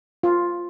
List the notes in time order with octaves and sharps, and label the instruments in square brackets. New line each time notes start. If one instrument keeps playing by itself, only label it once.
[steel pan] F4